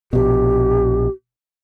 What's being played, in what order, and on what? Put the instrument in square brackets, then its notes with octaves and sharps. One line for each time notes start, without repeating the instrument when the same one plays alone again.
[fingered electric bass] A#1 B2 [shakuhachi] G4